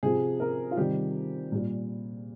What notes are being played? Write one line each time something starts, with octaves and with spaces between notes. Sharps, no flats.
C3 F3 G#4
A#4
F4
C3 D#3 G3 G4
A#2 G3